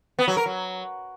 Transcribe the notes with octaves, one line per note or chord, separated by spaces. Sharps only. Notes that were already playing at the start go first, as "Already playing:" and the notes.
B3
F#3
A#4
F#3